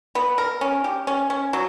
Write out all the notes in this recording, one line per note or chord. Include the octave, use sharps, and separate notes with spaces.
B3
A#4
C#4
G4
C#4
C#4
F#3